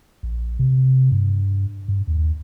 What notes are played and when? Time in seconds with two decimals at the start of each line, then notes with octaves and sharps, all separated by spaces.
0.23 A#1
0.59 C3
1.11 G2
1.88 G2
2.07 D#2